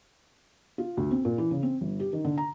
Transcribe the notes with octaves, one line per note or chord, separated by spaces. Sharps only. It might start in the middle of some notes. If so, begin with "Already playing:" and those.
F4
D2
C4
A#2
E3
C#3
C4
G1
G4
D#3
D3
A#5